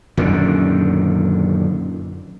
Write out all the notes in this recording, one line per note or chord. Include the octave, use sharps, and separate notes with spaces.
F#2 A#2 D3 D#3